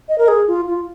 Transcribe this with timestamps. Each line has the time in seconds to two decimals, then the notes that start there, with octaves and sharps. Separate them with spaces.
0.09 D#5
0.18 A#4
0.28 G#4
0.48 F4
0.67 F4